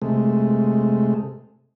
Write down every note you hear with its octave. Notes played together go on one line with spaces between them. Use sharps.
C3 G#3 A3